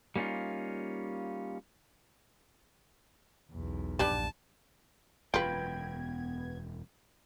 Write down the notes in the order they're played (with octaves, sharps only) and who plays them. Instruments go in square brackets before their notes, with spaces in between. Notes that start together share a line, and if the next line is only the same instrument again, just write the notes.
[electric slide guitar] G3 A#3 C#4 D#4 F4
[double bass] B1 E2
[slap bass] A#1 G2 [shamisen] D4 G4 B4 [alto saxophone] A5
[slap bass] E1 F#2 [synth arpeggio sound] B3 G#6 [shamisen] F4 B4 [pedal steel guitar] G5 B5